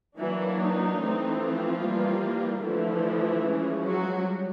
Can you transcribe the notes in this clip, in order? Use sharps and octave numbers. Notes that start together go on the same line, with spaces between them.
E3 F#3 A#3 D4 E4
D#4
E3 A3 C4
F3 F4
E3 G3 A#3
D3 E3 F3 A3 E4
F3 G#3 C#4
F#3 F#4
G3